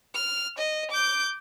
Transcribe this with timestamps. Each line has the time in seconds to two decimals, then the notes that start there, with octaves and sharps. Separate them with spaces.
0.15 F6
0.58 D#5
0.91 D6 G6